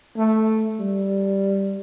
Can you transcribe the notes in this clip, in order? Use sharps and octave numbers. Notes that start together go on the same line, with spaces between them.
A3
G3